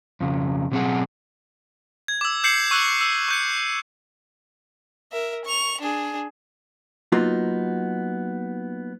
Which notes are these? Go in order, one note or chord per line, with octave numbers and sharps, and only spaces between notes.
F2 C#3
B2 F#3 C4 E4 G#4 F#5
G#6
D6 E6
D6 G6 C7 C#7 F#7
C#6 E6 F#6 F#7
E6
C#6 G6 C#7
A#4 E5
C#6 F7
D4 G#4
F#3 A#3 B3 D#4 F4 F#4